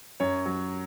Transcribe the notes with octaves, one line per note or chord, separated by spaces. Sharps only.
F#2 C#5
F#3